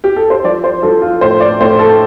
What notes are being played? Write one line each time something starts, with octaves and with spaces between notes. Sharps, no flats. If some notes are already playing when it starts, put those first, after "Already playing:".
G4
A4
C5
F3 D5
C5
F3 A4
F4
A2 C5
D5
A2 C5
A4